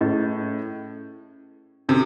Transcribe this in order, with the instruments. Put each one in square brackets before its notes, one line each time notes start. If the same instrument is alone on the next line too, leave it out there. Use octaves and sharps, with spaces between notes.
[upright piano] A2 [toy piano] C#4 E4 G#4 B4 D#5
[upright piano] C3 [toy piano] D4 F#4 A4